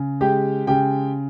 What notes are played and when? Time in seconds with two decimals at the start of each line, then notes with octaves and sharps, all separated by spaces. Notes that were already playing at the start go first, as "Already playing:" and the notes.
Already playing: C#3
0.21 G#3 G4 G5
0.67 C#3 G4 G5